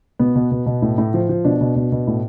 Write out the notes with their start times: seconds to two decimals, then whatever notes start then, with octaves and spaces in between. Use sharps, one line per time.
0.19 B2 B3
0.35 B2
0.51 B2
0.66 B2
0.82 A2
0.98 A2
1.14 F3
1.29 F3
1.45 B2 D4
1.61 B2
1.76 B2
1.92 B2
2.07 A2